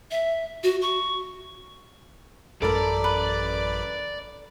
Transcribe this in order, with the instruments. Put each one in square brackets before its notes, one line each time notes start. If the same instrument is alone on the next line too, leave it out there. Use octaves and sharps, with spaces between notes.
[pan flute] E5
F#4
C#6
[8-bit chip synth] A1 F#2 B5 [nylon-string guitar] A4 A#4 [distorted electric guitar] D5
[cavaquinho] B4